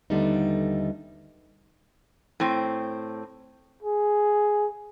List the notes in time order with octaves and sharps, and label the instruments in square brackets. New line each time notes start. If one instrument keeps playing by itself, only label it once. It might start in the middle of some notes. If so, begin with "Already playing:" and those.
[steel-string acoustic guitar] D#2 D3 G3 A3 B3 D#4
[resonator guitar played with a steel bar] A2 C4
[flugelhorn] G#4